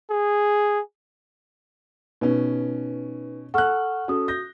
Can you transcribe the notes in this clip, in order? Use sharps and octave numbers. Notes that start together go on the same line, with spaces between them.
G#4
B2 C#4 D#4 B4
A4 F#5 C#6 F6 F#6
C#4 F#4 A4 D#6
G6 A#6